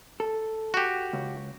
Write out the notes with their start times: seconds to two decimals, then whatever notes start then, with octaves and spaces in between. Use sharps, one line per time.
0.20 A4
0.74 F#4 G4
1.13 C#2